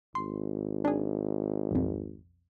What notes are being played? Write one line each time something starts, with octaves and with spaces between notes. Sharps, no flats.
G#1 C6
D4 G#4
B1 F2